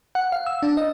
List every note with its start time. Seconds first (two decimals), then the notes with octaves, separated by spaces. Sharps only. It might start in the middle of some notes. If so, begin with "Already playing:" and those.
0.15 F#5
0.32 F5
0.46 E6
0.63 D4
0.77 D#5